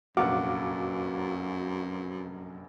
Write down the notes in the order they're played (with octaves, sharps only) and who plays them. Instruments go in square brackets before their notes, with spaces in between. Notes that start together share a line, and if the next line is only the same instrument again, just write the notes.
[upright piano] F1 A#1 F#5 [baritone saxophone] F#2 [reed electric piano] F#4 F5 D6